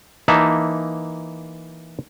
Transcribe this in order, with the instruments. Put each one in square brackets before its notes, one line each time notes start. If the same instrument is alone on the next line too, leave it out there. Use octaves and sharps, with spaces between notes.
[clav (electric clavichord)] E3 A#3 D#4 E5 A5